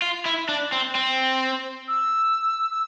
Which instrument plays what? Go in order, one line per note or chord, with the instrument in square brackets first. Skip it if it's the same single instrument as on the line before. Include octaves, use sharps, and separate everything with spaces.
[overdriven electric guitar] F4
E4
D4
C4
C4
[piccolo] E6
E6